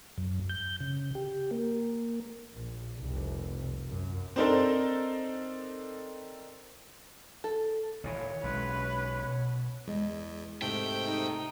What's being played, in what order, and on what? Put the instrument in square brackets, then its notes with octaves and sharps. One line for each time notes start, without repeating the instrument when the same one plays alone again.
[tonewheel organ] F#2
G6
C#3
G4
A#3
[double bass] A#1
F1 C2
F#2
[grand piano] C4 D4 D#4 A4 A#4 C5
[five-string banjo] A4
[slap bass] D#2 A#2 E3 [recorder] C#5
[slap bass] B1 G#3 [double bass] C#4 [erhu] B4
[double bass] B2
[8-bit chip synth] E2 [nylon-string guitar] G#3
[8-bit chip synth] G#2 C3 A3 [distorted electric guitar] G5
[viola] D#4